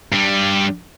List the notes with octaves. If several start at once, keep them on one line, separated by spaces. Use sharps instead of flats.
G2 G3